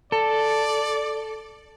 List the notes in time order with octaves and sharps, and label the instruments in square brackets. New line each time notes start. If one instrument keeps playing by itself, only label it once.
[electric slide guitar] A4 [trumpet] D5